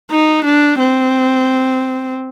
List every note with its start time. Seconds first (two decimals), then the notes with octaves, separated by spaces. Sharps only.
0.12 D#4
0.45 D4
0.79 C4